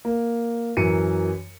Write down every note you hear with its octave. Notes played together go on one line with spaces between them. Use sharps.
A#3
F#2 E3 A#4 C#7 D#7